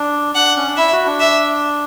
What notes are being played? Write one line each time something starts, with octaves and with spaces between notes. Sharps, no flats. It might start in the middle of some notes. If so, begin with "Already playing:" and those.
Already playing: D4
D4 F#5
C#4
D4
E4 E5
F#4
D4
E5